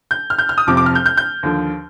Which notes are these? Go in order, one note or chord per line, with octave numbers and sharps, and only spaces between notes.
G6
F6
G6
F6
D#6
F1 F2 C3 F3 D6
D6
F6
G6
G6
G6
D#2 D3 F3